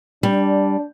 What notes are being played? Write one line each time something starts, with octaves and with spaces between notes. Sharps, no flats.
G3 D4